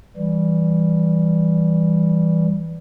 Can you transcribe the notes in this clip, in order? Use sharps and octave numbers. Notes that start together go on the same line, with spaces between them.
E3 G3